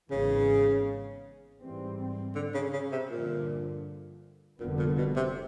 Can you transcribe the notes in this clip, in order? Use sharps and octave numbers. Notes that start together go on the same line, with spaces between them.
G#1 G#2 C#3 E3 G#3 B3
G#2 E3 G3 C4
D3
C#3
C#3
C3
G2 A#2 D3 F3
F1 F2 A#2 D3 G3 B3
A#2
B2
C3